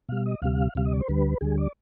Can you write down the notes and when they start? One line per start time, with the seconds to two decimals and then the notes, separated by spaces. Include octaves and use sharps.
0.09 B2 G3 F5
0.25 D#5
0.42 D2 C3 G3 F5
0.75 D2 C3 G3 F5
0.85 D#5
0.93 D5
1.00 C5
1.08 D2 D3 G3 B4
1.41 D2 D3 G3 G#4
1.58 D5